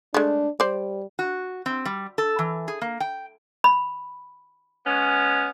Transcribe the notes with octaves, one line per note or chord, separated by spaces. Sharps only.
G#3 A3 D4
G3 C5 D5
F#4
C4
G3
A4
E3
G#4
A#3
G5
B5
G#3 B3 C#4